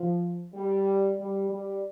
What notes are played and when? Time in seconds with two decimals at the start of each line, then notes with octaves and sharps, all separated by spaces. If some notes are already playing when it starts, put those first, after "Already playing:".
Already playing: F3
0.54 G3
1.17 G3
1.50 G3